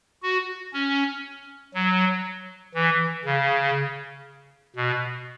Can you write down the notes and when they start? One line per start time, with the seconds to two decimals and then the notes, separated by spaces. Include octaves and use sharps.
0.22 F#4
0.73 C#4
1.74 F#3
2.75 E3
3.25 C#3
4.76 B2